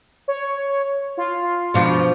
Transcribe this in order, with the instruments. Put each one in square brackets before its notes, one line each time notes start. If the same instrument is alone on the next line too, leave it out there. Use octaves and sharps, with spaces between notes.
[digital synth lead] C#5
F4
[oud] B2 F3 D4